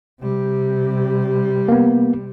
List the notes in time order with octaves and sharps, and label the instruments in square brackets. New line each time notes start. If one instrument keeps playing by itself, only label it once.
[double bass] C3 G3
[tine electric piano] A#3 B3